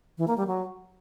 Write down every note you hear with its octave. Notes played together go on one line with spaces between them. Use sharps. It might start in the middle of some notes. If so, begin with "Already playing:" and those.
E3
A#3
G3
F#3